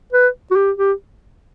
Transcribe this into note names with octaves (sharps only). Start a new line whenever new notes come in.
B4
F#4
G4
G4